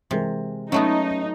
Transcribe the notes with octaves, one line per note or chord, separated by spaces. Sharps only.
C3 E3 G#3 A#4
F#3 A3 B3 C#4 D#4